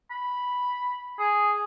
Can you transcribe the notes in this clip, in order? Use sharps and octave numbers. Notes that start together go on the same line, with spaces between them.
B5
G#4